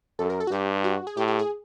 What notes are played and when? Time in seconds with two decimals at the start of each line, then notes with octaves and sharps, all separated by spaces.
0.19 F#2 A4
0.30 A#4
0.40 A4
0.47 F#4
0.51 G2 G4
0.84 F#4
1.07 G#4
1.17 A2 G4
1.28 G4
1.39 G#4